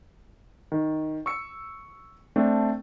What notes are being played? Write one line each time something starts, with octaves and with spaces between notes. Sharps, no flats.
D#3
C#6 E6 C#7
A3 C4 D4